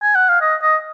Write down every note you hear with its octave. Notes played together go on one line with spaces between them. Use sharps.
G#5
F#5
F5
D#5
D#5